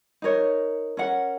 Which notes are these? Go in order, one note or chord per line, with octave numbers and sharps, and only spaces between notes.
D#4 A#4 C#5
C#4 A#4 F#5